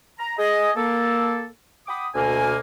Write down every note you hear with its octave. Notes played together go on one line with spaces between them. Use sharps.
A#5
G#4 D#5
A#3 A4
F#5 G5 B5 D6 D#6
D2 B2 A#3 G#5